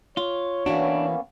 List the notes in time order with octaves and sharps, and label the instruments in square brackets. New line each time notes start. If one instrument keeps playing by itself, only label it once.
[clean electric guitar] F4 [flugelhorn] C#5
[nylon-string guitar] E3 E4 F#4 [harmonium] A#3 B3 C#4 [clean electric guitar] D4